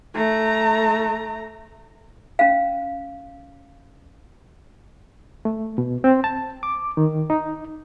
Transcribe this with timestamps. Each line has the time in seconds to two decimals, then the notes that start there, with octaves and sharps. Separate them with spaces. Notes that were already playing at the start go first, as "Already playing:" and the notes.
0.14 A3 A#5
2.39 C#4 F5
5.45 A3
5.78 B2
6.04 C4
6.24 A5
6.63 D6
6.97 D#3
7.30 D#4